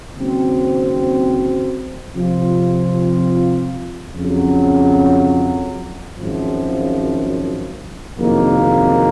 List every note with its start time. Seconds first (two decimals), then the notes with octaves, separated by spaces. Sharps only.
0.15 D#2 C#3 F#3 C4
2.15 C3 F3 C4 F4
4.15 F2 C#3 F#3
6.15 G#1 F#2 F3
8.16 F#1 F2 C3 D#3 A#3